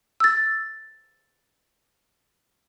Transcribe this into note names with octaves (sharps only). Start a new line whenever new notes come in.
E6 A6